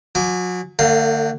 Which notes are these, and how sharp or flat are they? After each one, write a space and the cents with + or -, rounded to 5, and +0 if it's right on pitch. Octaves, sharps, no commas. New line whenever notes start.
F#3 -35 G#5 +0 D6 -15
D3 +25 A#3 -45 F5 +0